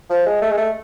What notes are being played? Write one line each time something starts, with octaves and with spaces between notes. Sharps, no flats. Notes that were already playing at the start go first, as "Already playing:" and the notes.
F3
G#3
A3
G#3
A3